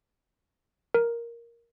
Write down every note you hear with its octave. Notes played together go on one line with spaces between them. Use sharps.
A#4